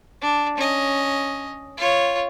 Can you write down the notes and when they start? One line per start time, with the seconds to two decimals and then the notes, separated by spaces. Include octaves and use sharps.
0.21 D4
0.57 C#4 D#5
1.77 F4 C#5